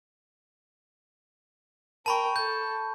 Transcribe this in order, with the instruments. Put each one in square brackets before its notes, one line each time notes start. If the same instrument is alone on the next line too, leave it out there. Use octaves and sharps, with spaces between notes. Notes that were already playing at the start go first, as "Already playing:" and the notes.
[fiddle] A#4 G5 [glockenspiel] A5 B5 C#6
[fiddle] A4 [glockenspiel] G6